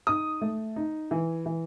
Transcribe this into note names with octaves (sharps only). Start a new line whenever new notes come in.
D#4 D#6
A3
D#4
E3
E3